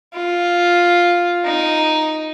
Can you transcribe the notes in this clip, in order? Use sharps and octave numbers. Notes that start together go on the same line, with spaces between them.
F4
D#4